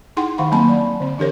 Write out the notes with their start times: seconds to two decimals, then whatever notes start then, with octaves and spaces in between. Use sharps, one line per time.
0.17 D#4 E4 G#4 F#5 G5 C6
0.38 D#3 F5 F#5 B5
0.51 F#3 A#3 C4 A5 B5
0.69 D5
1.00 D3 C4
1.18 E3 D4 G4 A#4 C#5